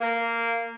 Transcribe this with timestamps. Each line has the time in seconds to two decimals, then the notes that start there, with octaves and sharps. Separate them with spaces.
0.01 A#3